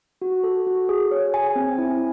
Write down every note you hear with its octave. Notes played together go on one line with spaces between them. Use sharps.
F#4
A4
F#4
G#4
C#5
G#5
C4
E4